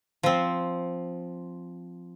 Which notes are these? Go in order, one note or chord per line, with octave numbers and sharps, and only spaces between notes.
F3 C4